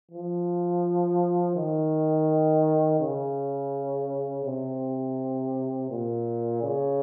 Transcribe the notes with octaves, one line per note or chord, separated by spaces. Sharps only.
F3
D#3
C#3
C3
A#2
C#3